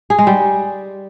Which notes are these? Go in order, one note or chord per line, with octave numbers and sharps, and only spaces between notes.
G#4
G#3
G3